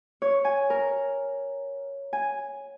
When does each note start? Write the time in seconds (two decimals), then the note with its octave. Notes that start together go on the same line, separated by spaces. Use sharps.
0.22 C#5
0.45 G#5
0.70 A#4
2.13 G#5